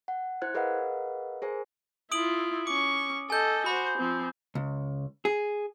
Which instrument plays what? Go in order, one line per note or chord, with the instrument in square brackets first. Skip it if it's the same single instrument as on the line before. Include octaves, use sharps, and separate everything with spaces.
[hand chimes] F#5
E4 C5 F#6 G#6
G#4 A#4 B4 D#5 F5 F#5
G#4 A#4 C5 G#5
[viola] E4 F4 [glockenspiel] D#6 D7 F#7
[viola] C#4 C#6 [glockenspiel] D6
[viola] A4 D#5 [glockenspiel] G#5 G6
[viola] F#4 C5 [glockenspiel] B5
[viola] F3 C4
[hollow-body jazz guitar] C#2
G#4